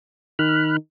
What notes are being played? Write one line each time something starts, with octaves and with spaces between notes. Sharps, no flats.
D#3 B5 F6 F#6